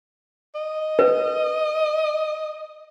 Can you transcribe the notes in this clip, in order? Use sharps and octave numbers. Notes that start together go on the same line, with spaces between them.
D#5
B4